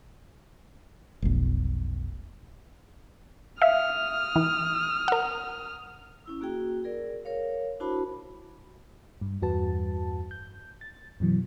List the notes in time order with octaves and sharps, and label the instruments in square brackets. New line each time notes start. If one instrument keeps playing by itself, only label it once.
[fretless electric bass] F1 B1
[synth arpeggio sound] E5 F5 [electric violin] D#6 F6
[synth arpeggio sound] E3
A#4 F#5
[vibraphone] C#4 E4 E6
A#3 F#4 G#4 G5
G#4 A#4 D5
A#4 C#5 F5
D4 E4 F#4 C5 A5 B5
[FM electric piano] G2
E2 G2 F#4 B4 A5
G6
A6
F#2 B2 E3 F#3